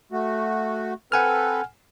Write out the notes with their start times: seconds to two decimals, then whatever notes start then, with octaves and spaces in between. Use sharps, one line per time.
0.12 A3 F#4
1.12 C4 A4 B4 F#5 G#5 F6